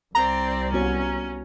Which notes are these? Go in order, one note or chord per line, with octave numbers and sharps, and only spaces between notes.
C2 C4 D5 A#5
B3 C#4 F#4 C#5